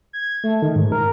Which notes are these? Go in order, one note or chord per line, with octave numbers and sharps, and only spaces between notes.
G#6
A3
D#3
G#2
A#4